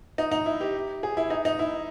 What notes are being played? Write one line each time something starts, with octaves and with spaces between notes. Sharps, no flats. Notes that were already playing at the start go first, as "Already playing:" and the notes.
D#4
D#4
E4
G4
G#4
E4
D#4
D#4
E4